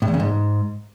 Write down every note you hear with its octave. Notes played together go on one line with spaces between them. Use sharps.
A2
E2
C#3
G#2